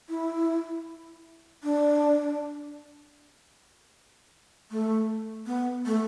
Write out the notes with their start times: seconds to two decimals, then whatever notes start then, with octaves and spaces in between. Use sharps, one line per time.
0.09 E4
1.63 D4
4.71 A3
5.47 B3
5.86 A3